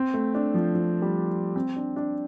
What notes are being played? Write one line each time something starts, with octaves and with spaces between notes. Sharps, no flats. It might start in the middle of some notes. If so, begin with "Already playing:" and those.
Already playing: C4
A3
D4
F3
F3
G3
C4
D4
D4